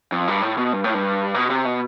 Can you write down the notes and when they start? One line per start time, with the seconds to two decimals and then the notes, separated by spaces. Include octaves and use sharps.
0.12 F2
0.28 G2
0.42 A2
0.57 B2
0.73 G2
0.84 A2
0.94 G2
1.34 B2
1.50 C3
1.65 B2